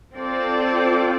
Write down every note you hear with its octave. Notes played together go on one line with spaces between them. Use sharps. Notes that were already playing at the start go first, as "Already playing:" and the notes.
C4 F4 A4 D5